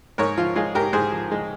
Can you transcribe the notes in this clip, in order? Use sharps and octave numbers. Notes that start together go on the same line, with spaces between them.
G#2 A#4 C#5
F3 F4
G#3 F4 G#4
G#2 G4 A#4
G#2 G#4 C5
F3
G#3